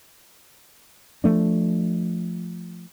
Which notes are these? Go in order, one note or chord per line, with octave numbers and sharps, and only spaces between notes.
F3 A3 D4